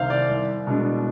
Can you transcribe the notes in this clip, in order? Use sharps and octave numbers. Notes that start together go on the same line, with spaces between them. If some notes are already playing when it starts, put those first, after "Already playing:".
Already playing: C2 C3 D#3 C5 F5
D5
C2
B2 G#3 D4